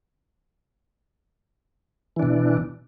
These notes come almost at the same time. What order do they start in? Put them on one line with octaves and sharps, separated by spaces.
E3 D4 B2